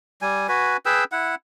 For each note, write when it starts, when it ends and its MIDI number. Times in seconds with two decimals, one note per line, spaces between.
0.22 0.47 55
0.22 0.47 80
0.49 0.77 66
0.49 0.77 71
0.49 0.77 80
0.86 1.04 68
0.86 1.04 71
0.86 1.04 79
0.86 1.04 88
1.12 1.35 64
1.12 1.35 78